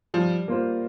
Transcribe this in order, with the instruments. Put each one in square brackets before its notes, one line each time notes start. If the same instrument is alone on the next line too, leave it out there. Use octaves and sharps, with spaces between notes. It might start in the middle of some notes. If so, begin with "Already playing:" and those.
[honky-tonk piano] F3 [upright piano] G3
[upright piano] A#3 F4 C5